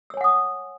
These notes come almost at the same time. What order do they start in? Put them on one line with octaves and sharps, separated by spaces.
E6 C#5 G#5 F#5 D#6